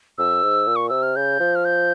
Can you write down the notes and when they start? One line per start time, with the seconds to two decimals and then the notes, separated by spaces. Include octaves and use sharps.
0.18 F2 E6
0.43 G#2
0.67 A#2
0.76 C#6
0.89 C3 E6
1.03 F6
1.16 C#3 G6
1.40 F3
1.55 F6
1.65 G6